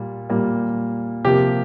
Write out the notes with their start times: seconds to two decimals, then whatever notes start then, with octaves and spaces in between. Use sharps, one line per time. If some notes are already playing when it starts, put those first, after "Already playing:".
Already playing: A#2 G3 A#3
0.30 A#2 G3 A#3
1.25 C3 F3 A#3 G4